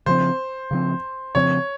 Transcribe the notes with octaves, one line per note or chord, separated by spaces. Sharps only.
C#3 F3 C4 C5
C#3 F3 C4
C#3 F3 C4 C#5